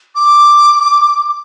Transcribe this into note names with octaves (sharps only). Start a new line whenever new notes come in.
D6